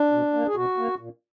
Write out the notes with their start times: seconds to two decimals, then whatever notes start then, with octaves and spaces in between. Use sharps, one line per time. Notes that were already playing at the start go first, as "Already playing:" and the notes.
Already playing: D4
0.12 B2
0.33 A#3
0.47 G#4
0.55 B2 F#4
0.78 A#3
0.99 A#2